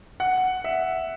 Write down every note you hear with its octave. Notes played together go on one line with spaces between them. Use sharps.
F#5
E5